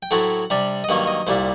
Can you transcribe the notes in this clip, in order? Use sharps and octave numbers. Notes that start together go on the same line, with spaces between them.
G5
A2 F#3 A3 C4 F#5
C3 G3 D4
D#5
G2 D#3 F#3 A#3 D#4 F#5
D#5
C2 A#2 G3 C5